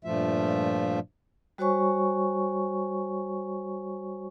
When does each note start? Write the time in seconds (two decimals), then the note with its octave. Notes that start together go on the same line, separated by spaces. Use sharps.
0.05 G2 A#2 F3 A3 F4 E5
1.58 G3 F#4 C5 C#5 G#5 C#6